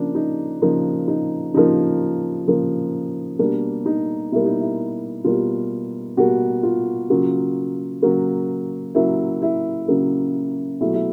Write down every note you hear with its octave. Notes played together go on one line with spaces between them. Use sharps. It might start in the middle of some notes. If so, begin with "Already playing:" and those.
Already playing: C#3 F3 A#3 D4
D#4
C#3 F3 A#3 D#4
D#4
C#3 F3 A#3 D#4
C#3 F3 A#3
B2 G3 A#3 D4
D#4
B2 G3 A#3 E4
D#4
E4
B2 G3 A#3 F4
B2 G3 A#3 F#4
F4
C#3 F#3 A#3 F4
C#3 F#3 A#3
C#3 F#3 A#3 E4
E4
C#3 F#3 A#3
B2 F#3 A3 E4
E4